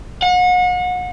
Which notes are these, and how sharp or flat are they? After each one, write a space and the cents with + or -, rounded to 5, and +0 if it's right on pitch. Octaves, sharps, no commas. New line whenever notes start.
F#5 -35